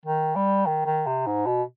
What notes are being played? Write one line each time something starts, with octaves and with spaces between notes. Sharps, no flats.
D#3
G3
D#3
D#3
C3
G#2
B2